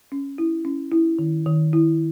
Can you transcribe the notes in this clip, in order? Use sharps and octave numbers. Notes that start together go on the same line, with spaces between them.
C#4
E4
C#4
E4
D#3
D#3
E4